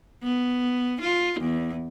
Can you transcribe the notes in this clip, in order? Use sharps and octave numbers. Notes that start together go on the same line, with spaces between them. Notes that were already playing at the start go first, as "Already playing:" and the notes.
B3
F4
E2